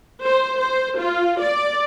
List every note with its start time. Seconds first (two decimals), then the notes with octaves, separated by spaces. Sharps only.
0.24 C5
0.59 C5
0.99 F4
1.40 D5